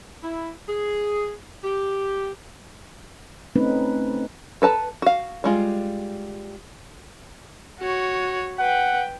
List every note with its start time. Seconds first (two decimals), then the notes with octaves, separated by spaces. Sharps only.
0.24 E4
0.68 G#4
1.63 G4
3.56 A3 C4 C#4 D#4 B4
4.62 A4 B4 A5 A#5
5.02 F#4 F5
5.44 G3 G#3 F4
7.80 F#4 C#5
8.59 B4 F#5 G5